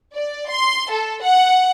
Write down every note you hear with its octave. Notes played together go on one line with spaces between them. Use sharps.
D5
C6
A4
F#5